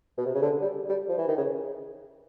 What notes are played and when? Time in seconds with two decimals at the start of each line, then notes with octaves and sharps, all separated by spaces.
0.18 B2
0.26 C3
0.34 C#3
0.42 D3
0.61 G3
0.89 G3
1.09 F3
1.18 E3
1.28 D#3
1.38 C#3